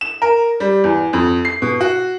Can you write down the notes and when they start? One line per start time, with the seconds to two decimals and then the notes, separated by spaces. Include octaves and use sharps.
0.01 E7
0.22 A#4
0.60 G3
0.84 E2
1.13 F2
1.45 C7
1.62 B2
1.81 F#4